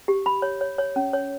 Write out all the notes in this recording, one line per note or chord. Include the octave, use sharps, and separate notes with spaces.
G4
B5
C#5
C#5
C#5
C#4
C#5